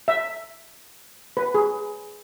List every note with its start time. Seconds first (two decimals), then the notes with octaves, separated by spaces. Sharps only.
0.08 E5
1.37 B4
1.54 G#4